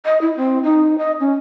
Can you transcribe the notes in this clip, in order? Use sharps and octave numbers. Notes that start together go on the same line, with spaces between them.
D#5
E4
C4
D#4
D#5
C#4